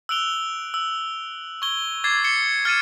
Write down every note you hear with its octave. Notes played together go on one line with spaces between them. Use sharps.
E6 F#6 D7 F7 G7
E6
C#6 G#6 G7
D6 G#6 A6 C7
C#7 E7 G7
F6 G#6 A6 C#7 D#7 E7